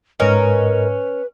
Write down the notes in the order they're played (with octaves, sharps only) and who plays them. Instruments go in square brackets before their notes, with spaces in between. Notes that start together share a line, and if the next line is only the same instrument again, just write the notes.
[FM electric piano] G#2 D#5 [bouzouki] C#4 [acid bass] A#4 [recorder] B4